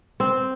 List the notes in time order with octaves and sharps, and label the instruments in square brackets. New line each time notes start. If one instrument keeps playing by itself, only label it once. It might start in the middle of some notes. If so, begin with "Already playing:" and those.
[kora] C4